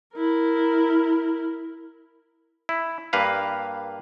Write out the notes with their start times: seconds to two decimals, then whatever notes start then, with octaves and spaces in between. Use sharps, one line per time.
0.15 E4 A#4
2.69 E4
3.13 G2 A#3 B4 F5